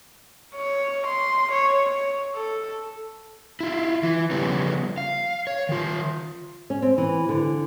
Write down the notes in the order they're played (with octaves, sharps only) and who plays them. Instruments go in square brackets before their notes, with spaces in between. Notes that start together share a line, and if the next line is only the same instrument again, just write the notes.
[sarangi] C#5
C6
C#5
C#5
A4
[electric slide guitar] E4 F4
E3
C#3 F3 G3 B3 C#4
F5
C#5
D#3 F4
[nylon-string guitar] C#4
C4
E3
D3